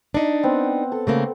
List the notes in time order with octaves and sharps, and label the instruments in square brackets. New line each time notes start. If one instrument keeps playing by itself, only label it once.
[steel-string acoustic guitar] D4 D#4
[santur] B3 C4 F#5
A4
[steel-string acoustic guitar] C#3 A3 A#3